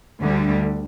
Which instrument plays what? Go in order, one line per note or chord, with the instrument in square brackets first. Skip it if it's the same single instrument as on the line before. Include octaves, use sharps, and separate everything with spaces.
[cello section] D2 D3 G3